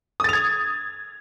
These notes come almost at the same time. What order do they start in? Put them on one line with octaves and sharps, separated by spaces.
D#6 A6 F7 G#6